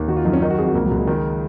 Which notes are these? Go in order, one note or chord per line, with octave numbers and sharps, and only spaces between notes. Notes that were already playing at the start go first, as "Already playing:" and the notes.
Already playing: D#2
D#3 F#4
F4
F#2 D#4
C#4
D#3 D#4
F#4
F2 G#4
F#4
C#2 A#3
F#3
C#2
G#3
D#3